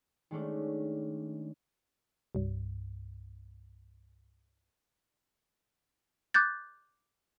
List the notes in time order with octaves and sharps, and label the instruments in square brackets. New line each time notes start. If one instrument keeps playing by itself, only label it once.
[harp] D#3 G#3 A3 C#4 D4
[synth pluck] C2 G2
[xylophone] D6 F#6 G6 A6